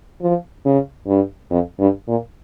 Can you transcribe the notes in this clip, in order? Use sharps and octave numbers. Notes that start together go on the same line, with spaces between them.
F3
C#3
G2
F2
G2
A#2